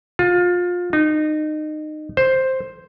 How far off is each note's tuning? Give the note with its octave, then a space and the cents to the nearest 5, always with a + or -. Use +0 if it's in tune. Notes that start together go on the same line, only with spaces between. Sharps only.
F4 +25
D#4 -25
C5 +5